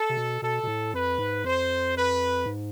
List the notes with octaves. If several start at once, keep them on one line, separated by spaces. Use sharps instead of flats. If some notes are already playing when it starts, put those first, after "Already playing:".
Already playing: A4
C3
B2
B2 A4
B2
A2
F2 B4
G#2
F2 C5
B4
G#2